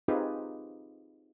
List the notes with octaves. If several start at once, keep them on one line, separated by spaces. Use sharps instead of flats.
C4 D#4 F4 G4 G#4 B4